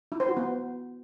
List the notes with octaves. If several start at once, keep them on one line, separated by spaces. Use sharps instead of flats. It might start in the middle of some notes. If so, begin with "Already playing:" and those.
E4
C5
F#4
B3